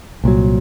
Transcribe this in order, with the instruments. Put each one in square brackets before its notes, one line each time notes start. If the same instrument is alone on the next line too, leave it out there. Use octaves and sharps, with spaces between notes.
[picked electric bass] C2 A#2 F#3